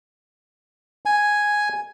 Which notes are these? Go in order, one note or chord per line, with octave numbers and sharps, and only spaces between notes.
G#5